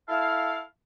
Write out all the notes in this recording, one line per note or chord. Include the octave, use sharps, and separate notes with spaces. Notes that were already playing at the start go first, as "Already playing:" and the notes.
E4 A4 F5